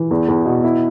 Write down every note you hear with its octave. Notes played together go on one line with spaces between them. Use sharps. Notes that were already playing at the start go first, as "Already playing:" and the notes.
Already playing: E3
E2
E2
B2
E4